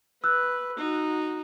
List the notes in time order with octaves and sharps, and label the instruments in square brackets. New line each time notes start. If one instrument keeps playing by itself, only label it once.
[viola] B4 [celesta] E6 F#6
[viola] D#4 F#4